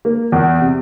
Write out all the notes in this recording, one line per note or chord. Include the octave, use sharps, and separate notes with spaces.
A#3
E2
C3